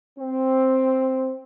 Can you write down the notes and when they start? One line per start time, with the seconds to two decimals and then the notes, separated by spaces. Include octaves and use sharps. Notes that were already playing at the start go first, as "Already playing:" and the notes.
0.19 C4